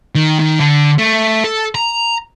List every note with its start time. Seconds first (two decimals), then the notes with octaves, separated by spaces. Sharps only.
0.15 D#3
0.39 D#3
0.60 D3
0.99 A3
1.44 A4
1.75 A#5